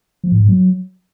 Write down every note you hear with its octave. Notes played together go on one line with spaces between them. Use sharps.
F3
A2
G#2
F#3